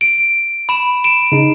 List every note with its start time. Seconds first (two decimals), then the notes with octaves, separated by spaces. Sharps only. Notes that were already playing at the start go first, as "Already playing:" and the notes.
0.01 D7
0.69 B5 E7
1.04 D7 E7
1.32 C#3 D#4